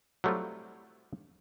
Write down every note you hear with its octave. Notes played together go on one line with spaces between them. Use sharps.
F#3 G3 A3 C4 E4 F4